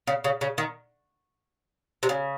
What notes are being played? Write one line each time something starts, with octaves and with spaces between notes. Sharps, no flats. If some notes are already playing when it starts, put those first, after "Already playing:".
C#3
C#3
C#3
D#3
C3
C#3